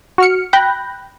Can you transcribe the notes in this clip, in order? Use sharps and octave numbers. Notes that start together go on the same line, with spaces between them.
F#4 F6 C#7
G5 B5 F#6 G6 A#6